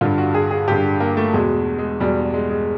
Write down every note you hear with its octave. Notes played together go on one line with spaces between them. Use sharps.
G2 D3 F4
F#4
G#4
G#4
G2 D3 G4
A#3
A3
E2 B2 G#3
G#3
E2 B2 G3
G#3
G#3